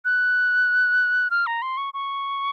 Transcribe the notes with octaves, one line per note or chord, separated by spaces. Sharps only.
F#6
F6
A#5
C6
C#6
C#6